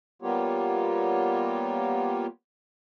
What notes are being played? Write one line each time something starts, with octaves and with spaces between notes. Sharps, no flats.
G3 A#3 B3 F4 G4 C#5